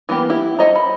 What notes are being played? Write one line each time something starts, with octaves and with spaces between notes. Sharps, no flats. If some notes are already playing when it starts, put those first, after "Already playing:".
E3 A#3 B3 G4
E4 G4
A4 C5 D#5 E5 A#5
B5